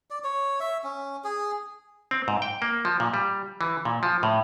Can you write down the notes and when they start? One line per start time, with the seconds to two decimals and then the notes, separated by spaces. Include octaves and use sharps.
0.10 D5
0.24 C#5
0.60 E5
0.84 C#4
1.24 G#4
2.11 C4
2.28 G#2
2.42 G5
2.62 A#3
2.85 F3
3.00 A#2
3.14 G3
3.61 E3
3.85 A#2
4.03 F3
4.23 A2